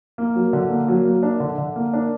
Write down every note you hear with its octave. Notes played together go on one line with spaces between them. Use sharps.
A#3
F#3
D3
A#3
F#3
A#3
D4
D3
D3
A#3
D4